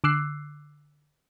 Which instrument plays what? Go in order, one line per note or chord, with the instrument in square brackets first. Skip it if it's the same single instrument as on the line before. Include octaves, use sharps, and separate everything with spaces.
[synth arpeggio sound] D3 D6 E6 F#6 C7